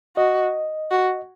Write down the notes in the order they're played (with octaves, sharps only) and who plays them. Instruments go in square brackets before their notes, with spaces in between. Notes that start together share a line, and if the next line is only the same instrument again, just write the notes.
[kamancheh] F#4 [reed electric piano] D#5
[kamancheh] F#4